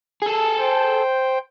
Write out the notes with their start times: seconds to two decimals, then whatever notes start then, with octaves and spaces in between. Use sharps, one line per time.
0.22 G#4 A4
0.59 C5 G5